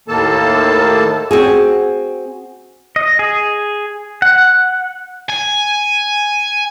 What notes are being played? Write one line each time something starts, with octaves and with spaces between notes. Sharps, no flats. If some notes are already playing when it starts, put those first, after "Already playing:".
D#2 A2 D#3 A#3 A4 A5
C4 F#4 G#4
D#5
G#4
F#5
G#5